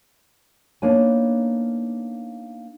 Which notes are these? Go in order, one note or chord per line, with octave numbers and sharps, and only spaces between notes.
A#3 B3 D4 D#4 C#5 G#5